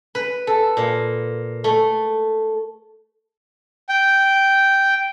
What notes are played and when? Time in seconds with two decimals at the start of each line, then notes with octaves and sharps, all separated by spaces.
0.15 B4
0.47 A4
0.77 A#2
1.64 A3
3.89 G5